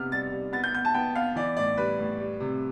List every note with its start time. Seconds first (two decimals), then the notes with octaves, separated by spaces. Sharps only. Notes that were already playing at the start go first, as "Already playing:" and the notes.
Already playing: C3 B3 F6
0.12 G3 A6
0.32 G3
0.53 B3 A6
0.64 G6
0.75 B3 G6
0.85 A5
0.94 B3 G5
1.15 B3 F5
1.36 E3 D5
1.57 A2 D5
1.78 G3 B4
1.99 A2
2.20 G3
2.40 C3